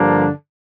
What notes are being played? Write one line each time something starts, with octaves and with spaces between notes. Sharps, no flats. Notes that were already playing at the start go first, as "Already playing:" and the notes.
Already playing: G2 D3 F3 A#3 D4